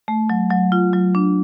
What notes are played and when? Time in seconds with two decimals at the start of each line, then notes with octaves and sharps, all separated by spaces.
0.08 A3
0.30 F#3
0.51 F#3
0.72 F4
0.93 F#3
1.15 D4